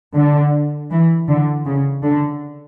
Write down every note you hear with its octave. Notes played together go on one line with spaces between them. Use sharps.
D3
E3
D3
C#3
D3